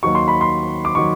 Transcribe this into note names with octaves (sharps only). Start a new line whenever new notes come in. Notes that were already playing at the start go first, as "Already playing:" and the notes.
D#2 D#3 F#3 C#6
C6
B5
C6
D6
D#3 F#3 C#6